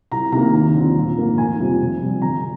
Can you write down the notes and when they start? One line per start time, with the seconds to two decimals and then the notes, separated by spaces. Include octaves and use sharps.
0.12 C2 A#5
0.32 C3 D#3 A#3 A#5
0.54 D#2
0.75 D3 F3 C4
0.96 A#1
1.17 G#2 D#3 A#3
1.37 F1 G#5
1.59 F2 C3 G3 C4
1.80 F1
2.01 F2 C3 G3
2.22 G1 A#5